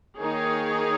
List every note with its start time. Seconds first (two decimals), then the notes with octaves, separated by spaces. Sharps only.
0.19 D#3 A#3 D#4 G#4 C#5